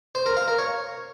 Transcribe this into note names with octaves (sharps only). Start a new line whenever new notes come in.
C5
A#4
F5
A#4
C#5